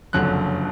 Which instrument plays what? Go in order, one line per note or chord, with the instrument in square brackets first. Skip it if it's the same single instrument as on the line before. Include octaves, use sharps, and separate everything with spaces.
[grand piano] F#1 F2 D3 F#3 F#6